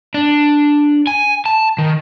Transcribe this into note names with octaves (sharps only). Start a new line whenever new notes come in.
D4
G#5
A5
D#3